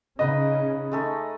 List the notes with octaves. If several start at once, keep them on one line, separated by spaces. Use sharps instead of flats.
C#3 D#4 B4 D#5 D#6
G#3 A3 D#4